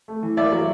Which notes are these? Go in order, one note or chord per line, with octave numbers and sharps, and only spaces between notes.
A3
E3
A#3 D5 E5
F#3